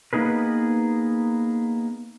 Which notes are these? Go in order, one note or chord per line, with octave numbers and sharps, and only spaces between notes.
A#3 B3 D#4 G#4 B4